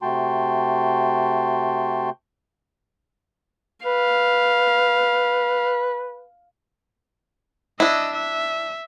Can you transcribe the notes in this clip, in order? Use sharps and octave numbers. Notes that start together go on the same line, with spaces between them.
C3 A3 F#4 G5 A5 C6
B4 F5
D4 E4 D#5 E6
E5